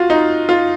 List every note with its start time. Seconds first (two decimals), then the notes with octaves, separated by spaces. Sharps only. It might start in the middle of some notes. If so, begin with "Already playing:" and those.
Already playing: F4 F#4
0.10 D#4
0.49 F4